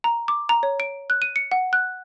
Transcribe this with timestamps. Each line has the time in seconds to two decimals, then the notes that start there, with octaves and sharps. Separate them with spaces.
0.04 A#5
0.28 D6
0.49 A#5
0.63 C#5
0.80 D7
1.10 F#6
1.22 D#7
1.36 C#7
1.52 F#5
1.73 F#6